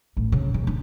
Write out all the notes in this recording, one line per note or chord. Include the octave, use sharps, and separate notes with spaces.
A1
C#3
C#3
D4